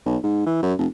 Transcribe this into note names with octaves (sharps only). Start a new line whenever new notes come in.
B1
G#2
E3
F#2
F1